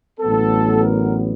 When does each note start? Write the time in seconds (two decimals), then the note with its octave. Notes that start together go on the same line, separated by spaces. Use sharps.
0.20 A1 A2 F#3 B3 A4
0.83 A#4